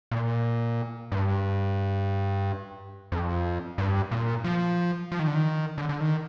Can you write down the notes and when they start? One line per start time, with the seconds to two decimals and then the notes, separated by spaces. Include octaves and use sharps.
0.11 A#2
1.12 G2
3.12 F2
3.78 G2
4.11 A#2
4.44 F3
5.12 F3
5.19 D#3
5.27 D3
5.35 D#3
5.78 D3
5.89 D3
6.01 D#3